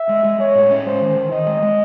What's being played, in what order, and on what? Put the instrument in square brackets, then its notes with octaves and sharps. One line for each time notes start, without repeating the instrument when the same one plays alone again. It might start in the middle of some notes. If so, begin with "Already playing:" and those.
Already playing: [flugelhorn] E5
[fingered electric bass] G#3
G#3
[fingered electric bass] G#3 [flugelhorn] C#5
[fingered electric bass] A2
C#4
[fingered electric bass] G#3 [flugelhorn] C5
[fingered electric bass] D#3
D#3
[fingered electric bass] D#3 [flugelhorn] D#5
[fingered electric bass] G#3
G#3